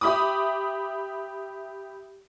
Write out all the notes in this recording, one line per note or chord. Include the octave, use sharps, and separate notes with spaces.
G4 E5 B5 D6 D#6